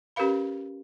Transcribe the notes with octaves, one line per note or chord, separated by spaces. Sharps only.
C#4 G4 A#4 B4 F5 B5